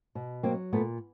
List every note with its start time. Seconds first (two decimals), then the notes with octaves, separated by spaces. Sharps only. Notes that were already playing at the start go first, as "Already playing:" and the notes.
0.15 B2
0.43 F#3 A#3 C4
0.73 A#2 A3 B3